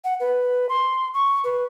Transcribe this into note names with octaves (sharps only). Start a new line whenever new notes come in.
F#5
B4
C6
C#6
B4